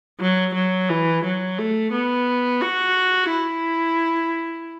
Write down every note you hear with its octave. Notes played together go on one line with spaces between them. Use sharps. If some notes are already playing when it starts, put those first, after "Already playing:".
F#3
F#3
E3
F#3
A3
B3
F#4
E4